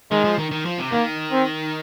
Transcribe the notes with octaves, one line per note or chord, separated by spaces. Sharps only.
D#3 G#3
F3
D#3
D#3
F3
C3
D#3 A#3
C4